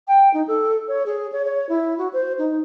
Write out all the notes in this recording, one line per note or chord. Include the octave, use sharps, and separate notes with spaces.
G5
D#4
A4
C#5
G#4
C#5
C#5
E4
F#4
C5
D#4